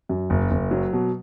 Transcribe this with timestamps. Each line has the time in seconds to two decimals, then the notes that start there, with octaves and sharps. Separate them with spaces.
0.09 F#2
0.30 F#1
0.51 F#1
0.71 F#3
0.93 B2